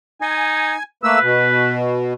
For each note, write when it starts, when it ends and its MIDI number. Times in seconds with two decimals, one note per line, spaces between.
0.21 0.74 63
0.21 0.83 80
1.03 1.19 57
1.03 1.19 58
1.03 1.75 71
1.03 1.19 88
1.22 2.13 47